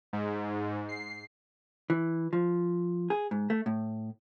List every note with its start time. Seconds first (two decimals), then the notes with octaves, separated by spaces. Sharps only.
0.13 G#2
0.89 C7
1.90 E3
2.33 F3
3.10 G#4
3.31 G#2
3.50 A3
3.66 A2